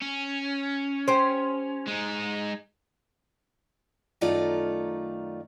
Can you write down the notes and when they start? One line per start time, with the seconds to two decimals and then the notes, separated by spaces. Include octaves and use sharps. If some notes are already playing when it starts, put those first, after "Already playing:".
0.01 C#4
1.08 G4 C5
1.87 G#3 D#4
4.21 F#2 D#3 A3 D#4 F4 D5